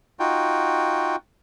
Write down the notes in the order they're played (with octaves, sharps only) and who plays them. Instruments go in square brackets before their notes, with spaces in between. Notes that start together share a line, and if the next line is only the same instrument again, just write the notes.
[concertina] D#4 F4 F#4 G5